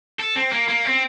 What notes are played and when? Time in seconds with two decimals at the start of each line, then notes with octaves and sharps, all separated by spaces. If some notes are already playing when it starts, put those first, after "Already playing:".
0.20 A4
0.36 C4
0.53 A#3
0.69 A#3
0.86 C4